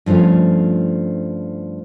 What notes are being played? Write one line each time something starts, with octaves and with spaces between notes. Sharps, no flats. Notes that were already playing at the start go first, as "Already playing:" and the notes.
G2 F3 A3 C#4 F4